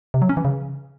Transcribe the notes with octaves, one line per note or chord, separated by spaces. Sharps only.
C3
F#3
C#4
E3
C#3